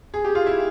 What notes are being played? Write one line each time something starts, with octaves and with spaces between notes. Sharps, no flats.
G#4
G4
F4
E4